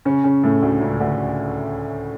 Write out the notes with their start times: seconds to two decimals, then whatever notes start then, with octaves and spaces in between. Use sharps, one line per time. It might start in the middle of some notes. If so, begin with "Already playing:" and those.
0.05 C#3 C#4
0.24 C#3 C#4
0.44 A2 A3
0.62 D2 D3
0.80 C#2 C#3
1.00 D2 D3